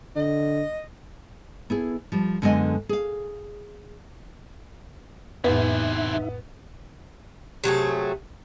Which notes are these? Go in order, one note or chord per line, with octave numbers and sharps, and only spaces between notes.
D3 D#5
B3 E4 G#4
F3 G3
F#2 D3 G#3 B3 D#5 G#5
G#4 F5
F2 A2 C3 E3 B3 D#4 E5
C3 F#3 A3 G#4